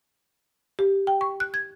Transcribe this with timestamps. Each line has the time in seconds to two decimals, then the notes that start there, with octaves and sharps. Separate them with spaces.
0.79 G4
1.07 G5
1.21 C#6
1.40 F#6
1.54 G#6